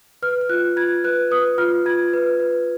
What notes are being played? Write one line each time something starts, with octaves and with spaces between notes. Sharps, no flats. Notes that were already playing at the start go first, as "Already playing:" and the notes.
B4 F6
F6
F4 F#6
F4 G#6
B4 F#6
B4 D#6
F4 F6
F4 G#6
B4
B4